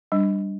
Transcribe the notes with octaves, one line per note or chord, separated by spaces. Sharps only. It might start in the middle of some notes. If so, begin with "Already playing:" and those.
G3 D4